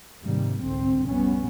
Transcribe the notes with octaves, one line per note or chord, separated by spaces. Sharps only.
G#2 C3 D#3 G3 A#3
G1 C2 G#2 D3 C4
F1 A#1 G3 B3 C#4